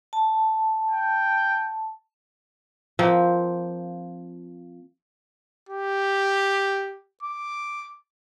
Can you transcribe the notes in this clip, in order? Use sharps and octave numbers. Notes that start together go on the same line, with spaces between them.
A5
G5
F3 A#3 C4
G4
D6